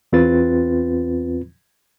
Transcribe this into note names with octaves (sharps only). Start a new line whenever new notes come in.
E2 C4 F4 B4 A6